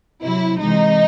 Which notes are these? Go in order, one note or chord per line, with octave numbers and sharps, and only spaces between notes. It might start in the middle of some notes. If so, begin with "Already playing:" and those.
C3 F#3 E4
C3 E3 G#3 D#4